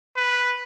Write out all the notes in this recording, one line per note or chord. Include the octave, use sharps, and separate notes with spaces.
B4